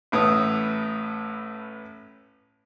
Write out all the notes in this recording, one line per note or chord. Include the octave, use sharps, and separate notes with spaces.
A1 A2 B3 D#6